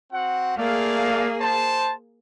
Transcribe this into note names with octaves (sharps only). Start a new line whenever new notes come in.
C4 F#4 F#5
A3 A#3 G#4 D5 F5
C5 A5